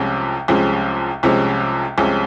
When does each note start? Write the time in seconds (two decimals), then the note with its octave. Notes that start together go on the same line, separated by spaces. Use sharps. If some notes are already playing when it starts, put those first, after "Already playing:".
Already playing: C2 C3 F3 G#3 C#4
0.48 C2 C3 F3 G#3 C#4
1.23 C2 C3 F3 G#3 C#4
1.98 C2 C3 F3 G#3 C#4